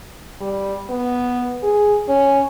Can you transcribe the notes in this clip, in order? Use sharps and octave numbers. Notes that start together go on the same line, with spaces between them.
G3
B3
G#4
C#4